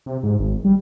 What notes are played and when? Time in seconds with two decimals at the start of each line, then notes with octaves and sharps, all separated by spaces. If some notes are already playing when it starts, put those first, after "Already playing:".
0.06 C3
0.23 G#2
0.39 G#1
0.65 G3